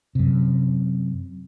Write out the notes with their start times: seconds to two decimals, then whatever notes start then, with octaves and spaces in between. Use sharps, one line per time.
0.15 F#2 C3